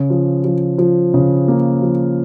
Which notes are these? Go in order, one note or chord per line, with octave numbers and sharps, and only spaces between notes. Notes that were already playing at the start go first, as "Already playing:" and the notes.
Already playing: C#3
F3
F3
F3
C#3
A#3
F3